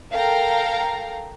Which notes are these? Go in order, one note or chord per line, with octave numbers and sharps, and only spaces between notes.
A4 A#4 F5 G5 A#5